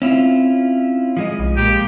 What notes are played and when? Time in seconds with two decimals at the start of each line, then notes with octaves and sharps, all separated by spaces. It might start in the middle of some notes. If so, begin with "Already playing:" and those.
0.02 C4 C#4 E4 F4
1.17 F3 G#3 D#5
1.39 B1
1.57 A#2 G#3 A#3 G4